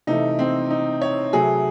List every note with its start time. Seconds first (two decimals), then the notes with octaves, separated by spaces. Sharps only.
0.07 C3 E3 A3 D#4
0.39 C4
0.71 D#4
1.02 C#5
1.33 C3 F#3 A3 G#4